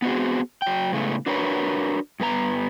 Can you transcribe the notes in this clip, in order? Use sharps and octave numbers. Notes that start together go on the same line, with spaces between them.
B3 C4 F#4 G#4
F#3 G5
A2 C#3 G#3 A3 B3
D4 F#4 A#4 B4 C#5
G2 B3 G#4 A#5